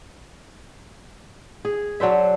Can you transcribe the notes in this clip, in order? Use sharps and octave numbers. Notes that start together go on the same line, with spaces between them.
G#4
F#3 D4 C5 E5